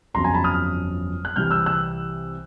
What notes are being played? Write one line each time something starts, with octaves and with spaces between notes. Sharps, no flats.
G1 F2 C#3 F#3 B3 A#5 C6
G#5 A#5
A5 B5
D#6 F6
F#6
C2 C3 E3 G3 F6 G6
E6 F#6
E6 F#6